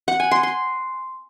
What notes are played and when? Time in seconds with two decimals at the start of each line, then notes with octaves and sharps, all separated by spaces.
0.08 F#5
0.20 G#5
0.31 C6
0.43 C6